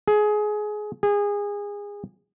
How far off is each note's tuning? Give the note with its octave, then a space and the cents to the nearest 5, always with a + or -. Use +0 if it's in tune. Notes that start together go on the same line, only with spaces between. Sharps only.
G#4 +20
G#4 -25